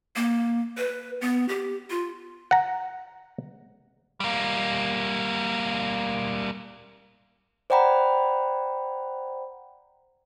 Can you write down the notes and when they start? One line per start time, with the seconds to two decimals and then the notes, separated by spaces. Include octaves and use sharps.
0.16 A#3
0.77 B4
1.21 B3
1.49 G4
1.90 F4
2.51 F#5 A#5
4.20 G3 A#3
7.70 C5 D5 F#5 G5 A#5 B5